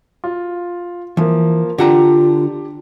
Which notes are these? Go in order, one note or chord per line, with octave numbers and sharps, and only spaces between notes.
F4
E3 F3 A#3
D3 D4 F4 G4 F#5 A#5